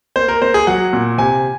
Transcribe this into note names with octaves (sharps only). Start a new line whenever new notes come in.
A#3 C5
A#4
A#3 C5
G#4
F#3 F#5
A#2
C3 G#5